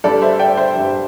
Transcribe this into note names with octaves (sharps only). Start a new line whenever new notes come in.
G1 G2 G3 A4 D5
C5 E5
D5 G5
C5 E5
G1 G2 G3